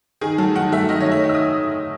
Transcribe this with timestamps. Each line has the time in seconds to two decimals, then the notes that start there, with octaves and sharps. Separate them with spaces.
0.21 D#3 G#4
0.38 F#3 A3 A4
0.55 D#3 F#5
0.72 F#3 A3 E5
0.89 D#3 D#5
1.00 C#5
1.06 A3
1.12 E5
1.24 D#3
1.29 E6
1.35 D#6